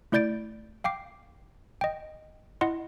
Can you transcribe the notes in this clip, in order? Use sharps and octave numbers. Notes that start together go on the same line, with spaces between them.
A3 E4 D5 G6 A6 D7
F5 G5 D6 C7
D#5 G5
E4 D#5 F#5 C6